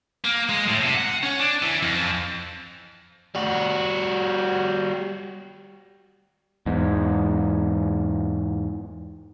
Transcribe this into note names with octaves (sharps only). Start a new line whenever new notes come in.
A#3
G#3
A2
C3
F#5
C#4
D4
E3
F2
G3 F#4
E2 G#2